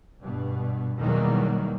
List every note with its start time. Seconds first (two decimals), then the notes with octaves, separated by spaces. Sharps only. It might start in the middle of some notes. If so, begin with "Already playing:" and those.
0.22 G2 B2
0.99 E2 B2 D#3 F#3 G3 A#3